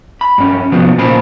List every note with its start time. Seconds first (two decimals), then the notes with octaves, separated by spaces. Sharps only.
0.21 B5
0.38 G2 C#4
0.72 C3 F3 F#3 B3
0.98 A#2 C#3 A#4 C5 B5